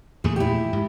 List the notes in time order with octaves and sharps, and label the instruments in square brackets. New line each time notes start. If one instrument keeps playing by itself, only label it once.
[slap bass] E2 A#2 A3 [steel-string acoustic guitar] G#4
[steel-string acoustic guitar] E4 G4
[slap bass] G#2